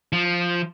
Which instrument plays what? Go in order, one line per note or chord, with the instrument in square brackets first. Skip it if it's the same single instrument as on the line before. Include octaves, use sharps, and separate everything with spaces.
[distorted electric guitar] F3